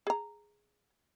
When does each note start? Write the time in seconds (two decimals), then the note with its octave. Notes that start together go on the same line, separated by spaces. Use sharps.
0.07 G#4 A#5